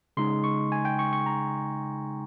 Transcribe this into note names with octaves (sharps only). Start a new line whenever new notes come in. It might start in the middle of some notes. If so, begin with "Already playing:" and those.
C#3 G#3 D#4 C6
C#6
G#5
G5
C#6
C#6
A#5